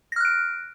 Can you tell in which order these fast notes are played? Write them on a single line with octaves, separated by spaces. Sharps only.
A#6 F6 F#6 D7